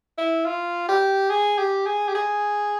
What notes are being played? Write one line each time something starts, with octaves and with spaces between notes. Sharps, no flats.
E4
F4
G4
G#4
G4
G#4
G4
G#4